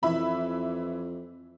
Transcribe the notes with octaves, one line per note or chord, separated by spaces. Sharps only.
F2 E3 E5 B5